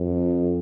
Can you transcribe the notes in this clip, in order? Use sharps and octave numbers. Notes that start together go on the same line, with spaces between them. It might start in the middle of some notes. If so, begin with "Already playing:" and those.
Already playing: F2